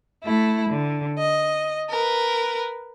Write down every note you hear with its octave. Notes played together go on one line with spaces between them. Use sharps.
A3 E4
D3
D#5
A#4 B4